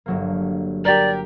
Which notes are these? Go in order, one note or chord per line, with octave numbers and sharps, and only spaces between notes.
G1 F#3 A#3
G4 A#4 D5